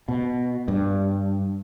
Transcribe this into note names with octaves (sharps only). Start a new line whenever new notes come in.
B2
G2